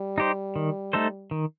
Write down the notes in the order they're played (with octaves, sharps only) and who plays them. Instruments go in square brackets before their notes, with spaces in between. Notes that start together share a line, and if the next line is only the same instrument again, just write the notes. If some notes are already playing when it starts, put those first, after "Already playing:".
Already playing: [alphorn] G3
[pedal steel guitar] D#4 G4 C5
D#3
A3 D#4 A4 C5
D#3